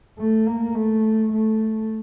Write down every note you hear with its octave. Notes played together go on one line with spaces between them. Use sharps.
A3
A#3
A3
A3